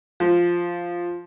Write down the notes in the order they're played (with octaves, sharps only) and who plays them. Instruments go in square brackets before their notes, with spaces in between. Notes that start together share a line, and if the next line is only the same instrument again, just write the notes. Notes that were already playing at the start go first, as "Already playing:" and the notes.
[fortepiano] F3